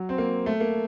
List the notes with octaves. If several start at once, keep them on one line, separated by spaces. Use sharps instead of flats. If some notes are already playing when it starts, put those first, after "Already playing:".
Already playing: F#3
C4
A#3
A3
A#3